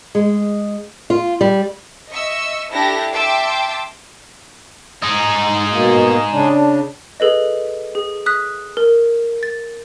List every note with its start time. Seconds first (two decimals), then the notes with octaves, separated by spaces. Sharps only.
0.15 G#3
1.10 F4
1.41 G3
2.09 D#5 E5 C#6 E6
2.72 D4 E4 G4 A4 A5 A#6
3.12 E5 G5 A5 C6 D6 E6
5.02 G#3 D#4
5.39 G#2
5.71 B2 A#3
6.32 C#3 D4
7.20 G#4 A4 B4 D#5
7.95 G#4
8.26 D#6 F#6 B6
8.77 A#4
9.43 A6